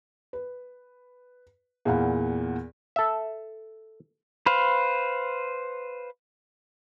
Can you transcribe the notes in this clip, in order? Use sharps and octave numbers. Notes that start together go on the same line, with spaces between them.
B4
E2 A#2 F5 F#5 B5
A4 E5
B4 C5 F5